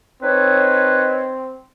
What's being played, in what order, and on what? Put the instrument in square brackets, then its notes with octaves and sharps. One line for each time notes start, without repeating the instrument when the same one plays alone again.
[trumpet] C4 [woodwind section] D#4 B4 C#5